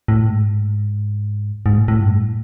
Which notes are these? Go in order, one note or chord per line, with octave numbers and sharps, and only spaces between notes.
A2
G#2
G#2
A2
A2
G2
A2